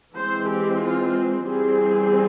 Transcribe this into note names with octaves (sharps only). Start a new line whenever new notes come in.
E3 G#3 C4 C5
G4
F4
E3 G3 C4 G#4